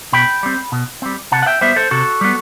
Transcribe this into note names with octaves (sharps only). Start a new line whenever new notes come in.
B2 G5 B5
G3 C4
B2
G3 C4
C3 F#5 A5
F#5
E5 G5
G3 B3 C5 E5
A4 C5
C3 F#4 A4
G3 B3